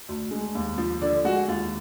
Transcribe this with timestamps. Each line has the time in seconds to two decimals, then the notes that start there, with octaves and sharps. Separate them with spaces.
0.09 D2
0.31 G#3
0.55 D#2
0.78 F3
1.02 D3 D5
1.25 G#3 F#4
1.48 D#2 F4